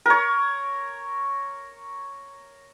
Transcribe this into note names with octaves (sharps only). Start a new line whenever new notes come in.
A#4 C#5